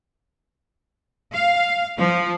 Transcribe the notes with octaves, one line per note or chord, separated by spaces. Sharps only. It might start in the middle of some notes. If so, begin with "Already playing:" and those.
F5
F3